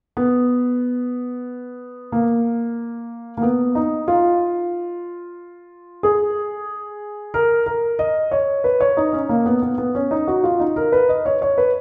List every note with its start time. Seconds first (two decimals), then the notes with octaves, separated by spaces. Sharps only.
0.17 B3
2.12 A#3
3.37 A#3
3.42 B3
3.75 D#4
4.08 F4
6.03 G#4
7.34 A#4
7.66 A#4
7.99 D#5
8.31 C#5
8.64 B4
8.81 C#5
8.97 D#4
9.13 C#4
9.29 A#3
9.46 B3
9.62 B3
9.78 B3
9.95 C#4
10.11 D#4
10.28 F#4
10.44 F4
10.60 D#4
10.76 A#4
10.92 B4
11.09 D#5
11.26 C#5
11.42 C#5
11.58 B4